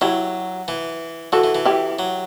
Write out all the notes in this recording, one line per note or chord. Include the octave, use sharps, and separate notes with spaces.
F#3 E4 G4
E3
E3 F#4 A4
E3
E3
E4 G4
F#3